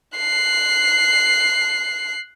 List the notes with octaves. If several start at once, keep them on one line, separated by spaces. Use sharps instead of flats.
F#6 C7